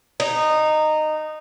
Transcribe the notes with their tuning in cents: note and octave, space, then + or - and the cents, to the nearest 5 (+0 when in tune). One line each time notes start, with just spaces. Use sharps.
D#4 -15